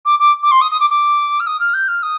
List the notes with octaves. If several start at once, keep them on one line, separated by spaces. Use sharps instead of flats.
D6
D6
D6
C6
D#6
D#6
D6
D6
F6
D#6
F6
G6
F6
D#6